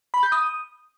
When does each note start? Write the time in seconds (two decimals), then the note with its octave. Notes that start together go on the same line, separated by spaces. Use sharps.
0.14 B5
0.23 G6
0.32 D#6